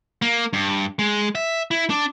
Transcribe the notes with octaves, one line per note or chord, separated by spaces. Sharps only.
A#3
G2
G#3
E5
E4
D4